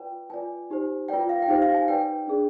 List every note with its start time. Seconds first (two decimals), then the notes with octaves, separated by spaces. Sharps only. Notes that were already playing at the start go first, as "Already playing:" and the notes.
Already playing: F4 B4 D5 G5
0.30 F4 B4 D5 G#5
0.70 D#4 G4 C5
1.09 F4 B4 D5 G5
1.29 F5
1.42 G5
1.48 D#4 G4 C5 F5
1.62 F5
1.74 G#5
1.88 D#4 B4 D5 G5
2.28 D4 G#4 D5